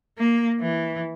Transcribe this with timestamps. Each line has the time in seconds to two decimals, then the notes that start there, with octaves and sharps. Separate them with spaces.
0.18 A#3
0.60 E3